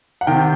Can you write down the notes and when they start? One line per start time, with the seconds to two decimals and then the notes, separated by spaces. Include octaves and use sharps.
0.21 F#5
0.27 C3 D#3 G5